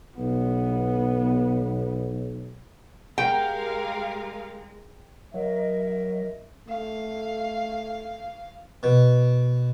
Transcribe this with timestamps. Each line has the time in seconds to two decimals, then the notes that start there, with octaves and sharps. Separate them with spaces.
0.18 B1 B3
3.18 G#3 G4 A#4 F5 G5
5.34 F#3 A#4 D#5 E5
6.69 A3 F5
8.83 B2